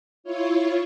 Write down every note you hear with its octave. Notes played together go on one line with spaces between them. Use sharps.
E4 F4 C#5